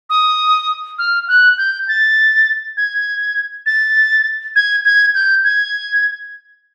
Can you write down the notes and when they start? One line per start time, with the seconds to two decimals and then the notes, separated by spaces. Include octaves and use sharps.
0.10 D#6
0.99 F6
1.28 F#6
1.58 G6
1.88 A6
2.77 G#6
3.66 A6
4.56 G#6
4.85 G#6
5.15 G6
5.44 G#6